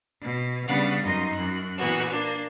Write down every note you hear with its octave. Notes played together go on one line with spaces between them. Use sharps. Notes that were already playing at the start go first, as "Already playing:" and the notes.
B2
C#3 G3 B3 D4 F5 F#5
F#2 D#4 D#5 C6
F#2 F#6
A#2 E3 B3 F#4
A#3 D4